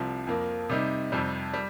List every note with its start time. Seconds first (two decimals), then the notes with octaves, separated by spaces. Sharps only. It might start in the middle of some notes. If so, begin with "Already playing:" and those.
Already playing: C2 C3 F3
0.27 F2 F3 A#3
0.70 C3 G3 D#4
1.12 F2 C3 G3
1.54 G3